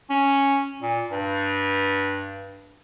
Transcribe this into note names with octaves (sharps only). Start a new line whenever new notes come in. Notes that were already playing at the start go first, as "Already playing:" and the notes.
C#4
A#2
G2